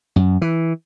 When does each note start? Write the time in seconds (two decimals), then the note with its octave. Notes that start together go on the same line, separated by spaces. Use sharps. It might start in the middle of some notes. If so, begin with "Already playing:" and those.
0.16 F#2
0.42 E3